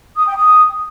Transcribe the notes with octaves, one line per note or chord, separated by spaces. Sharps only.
D#6
G5
D#6